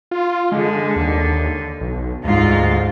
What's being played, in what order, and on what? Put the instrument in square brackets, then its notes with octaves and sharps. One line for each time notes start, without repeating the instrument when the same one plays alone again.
[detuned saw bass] F4
[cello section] D3 [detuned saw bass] G#3
[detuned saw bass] D#2
B1
[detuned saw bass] D2 [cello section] G#2 F4